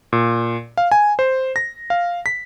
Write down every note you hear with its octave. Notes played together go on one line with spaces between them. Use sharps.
A#2
F5
G#5
C5
A#6
F5
B6